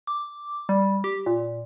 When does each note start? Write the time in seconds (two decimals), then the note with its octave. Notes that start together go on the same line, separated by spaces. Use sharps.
0.07 D6
0.69 G3
1.04 G4
1.26 A#2